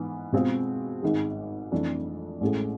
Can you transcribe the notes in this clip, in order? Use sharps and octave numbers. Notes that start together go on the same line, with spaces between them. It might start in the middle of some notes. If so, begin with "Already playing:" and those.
Already playing: G#2 E3 B3
B2 G#3 C4 F4 G#4
G#1 G#2 G#3
F2 E3 A3 D4 A4
A1 A2 G#3